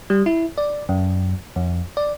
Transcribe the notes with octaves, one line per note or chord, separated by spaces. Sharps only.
G3
E4
D5
F#2
F2
D5